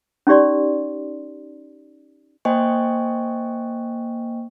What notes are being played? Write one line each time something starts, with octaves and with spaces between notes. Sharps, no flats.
C#4 D#4 G4 D5 C6
A#3 C5 D#5 G5 G#5 C#6